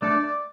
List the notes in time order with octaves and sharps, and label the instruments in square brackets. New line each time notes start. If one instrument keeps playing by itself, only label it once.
[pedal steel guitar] A3 D4 A4 [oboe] D5
[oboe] D5